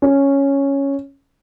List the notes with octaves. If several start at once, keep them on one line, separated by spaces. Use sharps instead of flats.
C#4